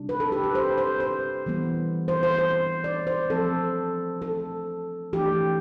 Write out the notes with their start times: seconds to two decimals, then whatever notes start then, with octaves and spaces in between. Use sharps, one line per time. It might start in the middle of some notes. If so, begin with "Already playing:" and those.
Already playing: C3 G3 D4
0.09 B4
0.20 A4
0.32 G4
0.44 B4
0.55 C5
0.78 C5
1.00 C5
1.46 E3 G3 B3
2.08 C5
2.23 C5
2.38 C5
2.84 D5
3.07 C5
3.30 F3 C4 A4
4.22 A4
5.13 E3 A3 D4 G4